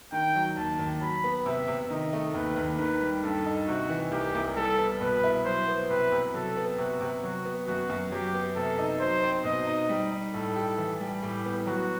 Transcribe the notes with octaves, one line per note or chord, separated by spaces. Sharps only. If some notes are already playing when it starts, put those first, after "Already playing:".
D#3 G5
F#3
D#2 A5
D#2
F#3 B5
B3
C3 E5
C3
D#3 D#5
A3
D#2 B4
D#2
D#3 B4
G3
G2 A4
D#4
C3 F#4
E3
C2 G4
C2
G3 A4
B3
B2 B4
E4
F#3 C5
B3
C3 B4
C3
F#3 A4
B3
C3 F#4
C3
F#3 F#4
B3
F#2 F#4
F#2
F#3 G4
B3
C3 A4
D#4
F#3 C5
C4
B2 D#5
D#4
G3
D#4
A2 A4
G4
E3
G3
A2 G4
B3
F#3 F#4